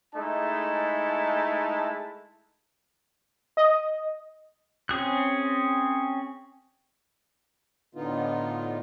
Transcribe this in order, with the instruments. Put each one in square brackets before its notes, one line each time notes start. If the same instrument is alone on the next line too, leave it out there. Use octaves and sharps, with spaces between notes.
[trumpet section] G#3 A3 D#4 E4 A5
[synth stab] D#5
[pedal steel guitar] C4 C#4 G#4 F#6
[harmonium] A2 D3 B3 D#4 F4